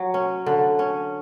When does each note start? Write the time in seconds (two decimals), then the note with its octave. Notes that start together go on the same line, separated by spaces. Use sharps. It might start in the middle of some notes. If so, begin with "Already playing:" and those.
Already playing: F#3
0.14 C#4
0.46 D3
0.79 C#4